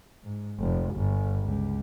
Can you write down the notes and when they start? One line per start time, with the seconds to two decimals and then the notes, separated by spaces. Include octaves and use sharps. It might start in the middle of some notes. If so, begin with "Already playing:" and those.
0.24 G#2
0.59 F1
0.96 G1
1.43 C#2